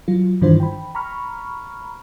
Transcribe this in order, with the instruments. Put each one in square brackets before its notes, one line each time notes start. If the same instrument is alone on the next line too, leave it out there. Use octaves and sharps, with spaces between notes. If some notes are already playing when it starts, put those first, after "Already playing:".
[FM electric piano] F#3 F4
G2 D#3 E3 D4 F4 C5
G5 B5
A#5 B5 C#6 F6